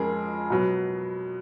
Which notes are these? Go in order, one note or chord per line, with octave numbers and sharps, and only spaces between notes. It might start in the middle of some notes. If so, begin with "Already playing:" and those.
Already playing: F2 C#3 F3 G#3 C#4 G#4 A#4
B2 F#3 B3